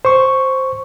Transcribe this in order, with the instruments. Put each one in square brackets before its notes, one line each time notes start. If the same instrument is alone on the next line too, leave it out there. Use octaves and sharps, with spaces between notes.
[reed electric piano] C5 C#6